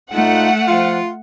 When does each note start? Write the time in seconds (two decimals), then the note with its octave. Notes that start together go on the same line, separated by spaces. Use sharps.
0.12 A2 A3 D#4 F4 F#5
0.67 F3 F4